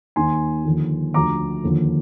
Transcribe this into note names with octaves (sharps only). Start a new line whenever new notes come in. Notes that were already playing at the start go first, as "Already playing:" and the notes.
D#2 D#3 G#5 C6
D#2 D3 F3
D2 D3 F3 A#5 D6
D#2 D3 F3